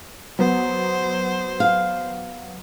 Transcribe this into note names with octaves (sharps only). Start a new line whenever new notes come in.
F#3 B3 C5
F5